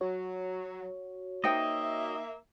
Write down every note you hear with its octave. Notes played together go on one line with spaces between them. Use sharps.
F#3 F#4 C#5
A#3 D#4 C5 D#5 E5 G5